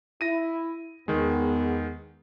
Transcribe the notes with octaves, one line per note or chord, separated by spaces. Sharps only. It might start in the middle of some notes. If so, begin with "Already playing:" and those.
E4 A#6 D#7
E2 D#3 G#3 B3